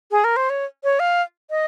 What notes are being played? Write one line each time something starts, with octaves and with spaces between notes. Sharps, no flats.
G#4
A#4
C5
C#5
C#5
F5
D#5